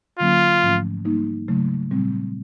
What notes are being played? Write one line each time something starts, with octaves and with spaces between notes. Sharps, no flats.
D3 F#3 A#3 C#4 F4
G#2 F3 A3 C#4
G3 A#3 D#4
C#3 F#3 A3
A#2 G3 C4